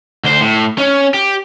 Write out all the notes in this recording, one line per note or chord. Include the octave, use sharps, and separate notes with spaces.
D2 C5
A2
C#4
G4